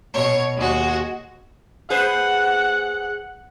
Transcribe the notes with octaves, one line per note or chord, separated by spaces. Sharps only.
B2 C#5
D#2 G#3 F#4
G#4 B4 C5 F#5